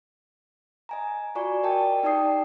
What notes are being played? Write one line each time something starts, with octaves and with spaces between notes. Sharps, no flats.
D#5 G#5 A#5
F4 F#4 D5 G#5 C#6
A#4 D5 D#5 G5 A5
D#4 G4 D5 G5 D#6 C7